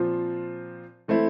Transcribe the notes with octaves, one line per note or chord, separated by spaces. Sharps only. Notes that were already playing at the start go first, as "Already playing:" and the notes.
Already playing: A#2 F3 C4 F4
E3 A3 C4 E4